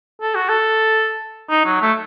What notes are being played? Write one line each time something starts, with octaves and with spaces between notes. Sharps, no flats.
A4
F#4
A4
D#4
F#3
A3